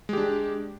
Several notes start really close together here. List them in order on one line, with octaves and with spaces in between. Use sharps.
G#3 G4 D4